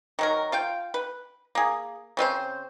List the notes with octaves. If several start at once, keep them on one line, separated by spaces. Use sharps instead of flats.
D#3 F#3 A#4
F4 F5 G5
B4
A#3 G#4
C#3 C4 F4 C5